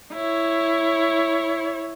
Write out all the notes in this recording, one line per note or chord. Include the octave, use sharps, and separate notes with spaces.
E4 C#5